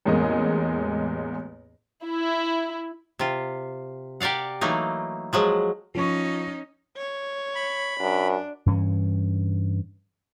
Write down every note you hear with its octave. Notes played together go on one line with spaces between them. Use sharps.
A1 E2 G#3 A#3 D#5
E4
C3 F4
G4 A#4 D5 F5 F#5
E3 F#3 A3 A#3 D#4
F3 F#3 G#3
F3 C#4 D#4 C#6
C#5
B5
F#2 D4
G2 E3 C#4